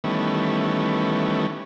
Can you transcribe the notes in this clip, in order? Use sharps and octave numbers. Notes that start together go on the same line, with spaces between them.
D#3 E3 G3 A3 B3 C#4